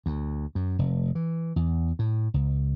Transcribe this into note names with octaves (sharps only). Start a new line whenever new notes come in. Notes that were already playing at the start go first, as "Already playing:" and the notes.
D2
F#2
F1
E3
E2
A2
C#2